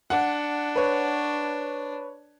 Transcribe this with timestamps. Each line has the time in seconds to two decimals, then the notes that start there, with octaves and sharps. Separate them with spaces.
0.10 D4 F#5
0.76 B4 C#5